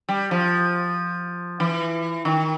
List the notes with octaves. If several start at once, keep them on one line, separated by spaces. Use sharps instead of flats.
G3
F3
E3
D#3